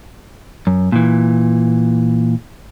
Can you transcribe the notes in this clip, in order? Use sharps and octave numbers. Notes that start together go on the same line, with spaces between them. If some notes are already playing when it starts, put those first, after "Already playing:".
F#2
A#2 E3